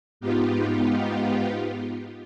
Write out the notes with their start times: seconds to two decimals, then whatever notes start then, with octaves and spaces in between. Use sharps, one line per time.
0.21 G#2 B3 D#4 F4 G4